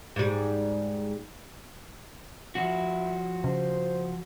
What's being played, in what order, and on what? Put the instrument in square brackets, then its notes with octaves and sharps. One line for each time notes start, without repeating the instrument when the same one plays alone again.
[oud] G#2 G3
[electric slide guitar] F3 F#4 [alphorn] E4
[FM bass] C#3 [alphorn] C5